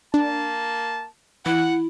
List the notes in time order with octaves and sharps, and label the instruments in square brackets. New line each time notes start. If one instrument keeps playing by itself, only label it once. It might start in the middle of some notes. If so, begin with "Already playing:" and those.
[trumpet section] A#3 A5 [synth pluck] D4
[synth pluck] E3 [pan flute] E4 [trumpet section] F#5